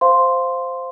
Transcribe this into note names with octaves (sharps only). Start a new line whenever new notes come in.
C5 F5 C6